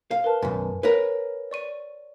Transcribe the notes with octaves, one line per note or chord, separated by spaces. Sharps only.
F5
A#4 B4 A5
B1 F#2 G#5
A#4 B4 C#5
D5 C#6 D#7